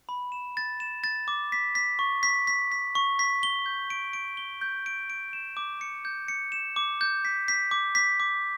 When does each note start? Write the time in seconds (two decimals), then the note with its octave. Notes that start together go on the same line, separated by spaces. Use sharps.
0.09 B5
0.32 E7
0.57 A6
0.80 E7
1.04 A6
1.28 D6
1.52 B6
1.75 B6
1.99 C#6
2.23 B6
2.47 B6
2.72 B6
2.95 C#6
3.19 B6
3.43 G7
3.66 G6
3.90 D7
4.13 D7
4.37 G7
4.61 G6
4.86 D7
5.10 D7
5.33 E7
5.57 D6
5.81 C#7
6.05 G6
6.28 C#7
6.52 E7
6.76 D6
7.01 G6
7.25 B6
7.48 B6
7.71 D6
7.95 B6
8.20 D6